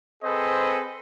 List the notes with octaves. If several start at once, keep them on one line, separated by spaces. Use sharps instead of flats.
C4 G#4 A4 B4 C5 D#5